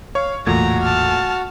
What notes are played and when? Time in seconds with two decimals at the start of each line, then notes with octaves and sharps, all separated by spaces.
0.15 C#5 F5 C#6
0.46 E1 A1 E2 A#2 A3 F#4 A#5 G#6
0.82 A5 F6